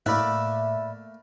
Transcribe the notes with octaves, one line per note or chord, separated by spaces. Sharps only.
A2 A3 A#3 D5 E5 B5 F#6